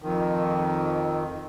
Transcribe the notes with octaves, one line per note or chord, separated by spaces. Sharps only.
F2 D#3